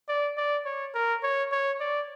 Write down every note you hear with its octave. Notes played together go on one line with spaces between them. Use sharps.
D5
D5
C#5
A#4
C#5
C#5
D5